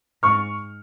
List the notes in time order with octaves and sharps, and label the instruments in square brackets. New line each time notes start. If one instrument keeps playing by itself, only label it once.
[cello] G#2 [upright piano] C#6 F6